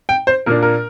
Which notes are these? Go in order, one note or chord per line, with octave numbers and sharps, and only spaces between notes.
G5
C5
A#2 A#3 D4 A#4
A#4